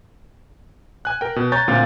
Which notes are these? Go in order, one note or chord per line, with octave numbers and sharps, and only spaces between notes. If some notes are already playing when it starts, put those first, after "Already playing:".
G#5 F#6
A#4 G5
B2
C#5 G#5 A#5 C#6 G6 A6
D2 A#2 A3 C4 F5 A6